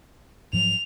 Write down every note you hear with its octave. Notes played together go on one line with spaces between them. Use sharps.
G#2 F3 F#3 F7